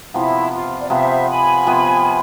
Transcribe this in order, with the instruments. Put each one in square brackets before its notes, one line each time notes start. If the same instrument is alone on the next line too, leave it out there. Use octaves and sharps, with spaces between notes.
[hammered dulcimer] C3 F3 B3 [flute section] E4
[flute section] F4
D5
[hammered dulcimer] C3 F3 B3 [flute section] C5 E5
[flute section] G#5 B5
[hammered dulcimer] C3 F3 B3